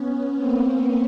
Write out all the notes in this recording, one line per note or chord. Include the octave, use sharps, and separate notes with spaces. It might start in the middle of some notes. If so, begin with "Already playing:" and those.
Already playing: B3 C#4
A#3 C4